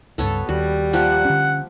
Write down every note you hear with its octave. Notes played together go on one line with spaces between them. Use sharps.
C#2 G2 B3 A4 C#5
D#2 G3 F#4
F3 A#3 G4 F#5
D3 C#4